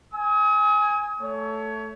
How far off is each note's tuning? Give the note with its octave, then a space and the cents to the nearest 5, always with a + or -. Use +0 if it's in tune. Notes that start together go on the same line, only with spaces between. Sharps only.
G#5 -5 D#6 +40
A3 +0 C#5 +25